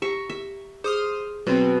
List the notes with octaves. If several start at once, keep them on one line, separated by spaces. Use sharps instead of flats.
G4 E5 A#5 C#6
E5
G#4 C5 D#6 F6
B2 F#3 C4